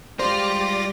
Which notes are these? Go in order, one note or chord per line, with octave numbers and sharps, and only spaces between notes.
G3 G#3 F4 G4 C5 D5 A#6